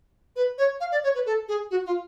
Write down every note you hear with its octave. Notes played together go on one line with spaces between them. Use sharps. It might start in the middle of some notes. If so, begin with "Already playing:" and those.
B4
C#5
F5
D5
C#5
B4
A4
G#4
F#4
F4